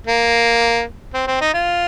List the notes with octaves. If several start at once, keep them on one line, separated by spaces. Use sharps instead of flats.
A#3
C4
C4
D#4
F4